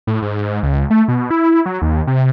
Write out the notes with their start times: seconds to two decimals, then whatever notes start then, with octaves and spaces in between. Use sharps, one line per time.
0.07 A2
0.22 G#2
0.63 C#2
0.91 A3
1.08 B2
1.31 E4
1.66 F#3
1.82 D#2
2.07 C3